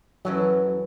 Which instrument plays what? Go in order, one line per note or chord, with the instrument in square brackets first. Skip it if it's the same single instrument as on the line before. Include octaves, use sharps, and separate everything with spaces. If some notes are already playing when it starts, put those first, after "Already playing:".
[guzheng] F#2 E3 A4 [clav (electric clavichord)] F#3